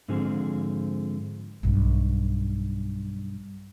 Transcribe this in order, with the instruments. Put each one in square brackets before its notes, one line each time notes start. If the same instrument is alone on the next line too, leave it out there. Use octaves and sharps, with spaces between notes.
[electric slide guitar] G#2 D3 F3 C4 G#4
[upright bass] B1 G2